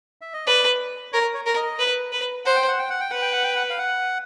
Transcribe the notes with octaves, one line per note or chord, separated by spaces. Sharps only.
E5
D#5
B4 D5
A#4 C#5
C#5
A#4
D#5
B4
B4
C5 F#5
G5
F#5
G5
F#5
G5
B4 F#5
G5
F#5
G5
F#5
F5
F#5